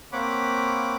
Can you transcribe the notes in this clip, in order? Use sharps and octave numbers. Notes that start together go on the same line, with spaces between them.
A#3 C4 C#5 F#5 B5 D6